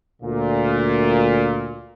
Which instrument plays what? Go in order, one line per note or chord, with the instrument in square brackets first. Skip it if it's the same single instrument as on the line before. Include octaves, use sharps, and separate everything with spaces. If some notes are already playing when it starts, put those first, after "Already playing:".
[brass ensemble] D2 A#2